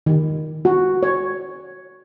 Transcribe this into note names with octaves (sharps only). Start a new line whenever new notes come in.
D#3
F#4
C#5